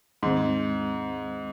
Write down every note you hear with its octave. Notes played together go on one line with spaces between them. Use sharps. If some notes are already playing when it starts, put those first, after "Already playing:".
D#2 G#2 D#3 G#3 C4